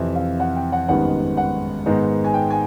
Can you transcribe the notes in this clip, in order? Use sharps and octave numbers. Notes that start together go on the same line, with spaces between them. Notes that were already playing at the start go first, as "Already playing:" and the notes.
Already playing: F2 C3 E3 E5
F5
F#5
G5
F#5
G#1 F#2 D#3 G3 B3 F#5
F#5
G#2 D#3 G#3 B3 D#4
G#5
G5
G#5